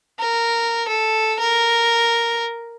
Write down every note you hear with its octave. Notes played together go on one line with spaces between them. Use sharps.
A#4
A4
A#4